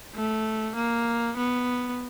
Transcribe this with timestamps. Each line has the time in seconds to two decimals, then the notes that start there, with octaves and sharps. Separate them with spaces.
0.15 A3
0.76 A#3
1.37 B3